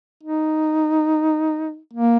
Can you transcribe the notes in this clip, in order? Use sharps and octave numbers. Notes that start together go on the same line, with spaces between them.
D#4
A#3